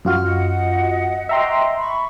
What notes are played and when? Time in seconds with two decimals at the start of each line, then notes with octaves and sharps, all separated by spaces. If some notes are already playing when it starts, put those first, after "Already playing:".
0.05 F#2 F4 F#4 F6
0.23 D#5 F#5
1.29 F#4 D#5 E5 G5 A#5 C6
1.78 B5 C#6